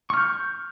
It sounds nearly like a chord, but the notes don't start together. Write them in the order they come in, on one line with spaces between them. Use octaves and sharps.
C#6 F6 G6